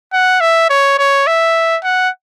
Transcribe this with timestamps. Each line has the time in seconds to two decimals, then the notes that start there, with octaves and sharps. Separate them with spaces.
0.13 F#5
0.41 E5
0.70 C#5
0.98 C#5
1.27 E5
1.84 F#5